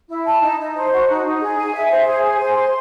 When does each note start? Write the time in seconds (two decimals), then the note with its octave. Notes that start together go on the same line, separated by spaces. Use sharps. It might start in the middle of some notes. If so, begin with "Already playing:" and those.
0.10 E4
0.26 A5
0.42 D#4
0.60 D#4
0.75 C5
0.92 F#4
1.09 D#4
1.24 D#4
1.41 G#4
1.58 G#5
1.74 E5
1.90 C5
2.07 G#4
2.23 G#5
2.39 C5
2.56 C6